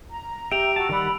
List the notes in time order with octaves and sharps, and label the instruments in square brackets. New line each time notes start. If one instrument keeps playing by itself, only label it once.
[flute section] A#5
[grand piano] G4 [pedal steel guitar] E5 G5 [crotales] D7 F7
[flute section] F#4 A#5 E6 [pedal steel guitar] A5
[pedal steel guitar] D#3 G3 F#5 [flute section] D5 B5 [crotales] E6